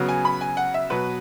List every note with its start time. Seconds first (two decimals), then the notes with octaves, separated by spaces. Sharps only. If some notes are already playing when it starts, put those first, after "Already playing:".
Already playing: C#3 F#3 B3
0.09 G#5
0.25 B5
0.41 G#5
0.57 F#5
0.74 E5
0.90 B2 F#3 B3 B4